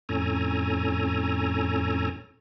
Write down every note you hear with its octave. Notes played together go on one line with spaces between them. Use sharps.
F2 A2 C#4 A4 G#5 A#5